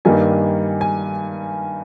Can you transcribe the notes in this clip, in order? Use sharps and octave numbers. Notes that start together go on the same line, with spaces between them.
G2 D#3 G3 A#3 G#5
G#5